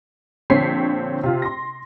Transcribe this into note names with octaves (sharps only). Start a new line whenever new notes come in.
A#1 D3 C4 C#5 B6 C7
C3 F4
C6 A#6